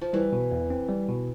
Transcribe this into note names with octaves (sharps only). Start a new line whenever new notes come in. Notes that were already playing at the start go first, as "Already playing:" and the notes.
F3
E3 G3
B2
E2
C4
G3
B2